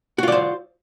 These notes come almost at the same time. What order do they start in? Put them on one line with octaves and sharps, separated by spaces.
F#4 F4 D5 C5